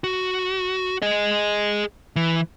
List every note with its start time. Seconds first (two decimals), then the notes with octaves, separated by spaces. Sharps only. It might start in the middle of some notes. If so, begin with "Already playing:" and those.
0.04 F#4
1.02 G#4 D#5
2.16 E3